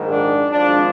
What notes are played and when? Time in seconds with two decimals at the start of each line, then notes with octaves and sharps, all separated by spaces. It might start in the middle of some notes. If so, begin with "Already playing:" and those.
Already playing: A#1 G#2 D#3
0.10 D4
0.52 G#1 G#2 F3 D4